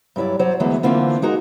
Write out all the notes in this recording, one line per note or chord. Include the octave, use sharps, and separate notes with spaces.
G2 F#3 E4 C#5 D5
F#3 C5 D5
D2 E3 F#3 G#3 B3
D3 E3 A#3 C4 F4
G#3 D#4 F#4 A#4